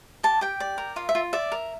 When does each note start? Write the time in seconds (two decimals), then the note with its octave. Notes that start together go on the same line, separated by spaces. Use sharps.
0.23 G4 A5
0.41 G4 G5
0.60 D5
0.78 A#4
0.96 F4 F5
1.09 E5
1.15 F4
1.33 D5 E5
1.52 A#4